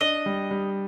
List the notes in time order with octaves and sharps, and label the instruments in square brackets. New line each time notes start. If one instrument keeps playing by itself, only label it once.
[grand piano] D4 [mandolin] D#5
[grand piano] G3
G3